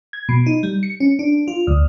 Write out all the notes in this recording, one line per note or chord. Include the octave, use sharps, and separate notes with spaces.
G#6
B2
D#4
G3
C#7
C#4
D4
F4
D2